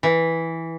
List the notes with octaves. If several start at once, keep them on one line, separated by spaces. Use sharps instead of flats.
E3